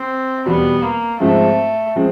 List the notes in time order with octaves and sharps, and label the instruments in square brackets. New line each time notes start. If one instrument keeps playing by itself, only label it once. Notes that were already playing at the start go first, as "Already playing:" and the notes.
Already playing: [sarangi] C4
[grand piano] E2 B2 G3 [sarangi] B3
[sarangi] A#3
[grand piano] G#2 F3 G#3 C4 [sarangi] A3
[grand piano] F3 G#3 C4